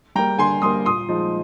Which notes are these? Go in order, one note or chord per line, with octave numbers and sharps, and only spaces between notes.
G3 A#3 G5 A#5
D3 G#5 C6
G3 A#3 C6 D#6
A#2 C6 D#6
F3 G#3 D#4